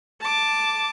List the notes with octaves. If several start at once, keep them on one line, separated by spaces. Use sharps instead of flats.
A5 D6